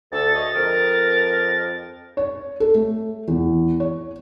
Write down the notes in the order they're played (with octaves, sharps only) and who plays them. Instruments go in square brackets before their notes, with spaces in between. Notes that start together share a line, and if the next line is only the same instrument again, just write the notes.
[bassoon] D2 [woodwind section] A4 [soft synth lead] A6
[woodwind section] G#4 C#5 D#5
[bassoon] F2 [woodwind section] A#4
[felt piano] C#5
A4
A3
E2
C#5